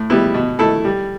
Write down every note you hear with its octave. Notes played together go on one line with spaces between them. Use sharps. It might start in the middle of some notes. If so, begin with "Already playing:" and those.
Already playing: A2
G3 B3 E4
B2
A3 E4 A4
G3